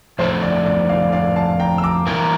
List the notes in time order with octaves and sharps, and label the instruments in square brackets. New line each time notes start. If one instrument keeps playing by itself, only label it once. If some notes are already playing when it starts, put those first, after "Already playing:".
[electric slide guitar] F2 D3 A3 E4 A4 [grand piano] C5
[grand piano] D5
D5
D5 F5
D5 F5
F5 A5
G5 A#5
E6
A#5 D6
[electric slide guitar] E3 A#3 E4 A#4 [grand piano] A#5 D6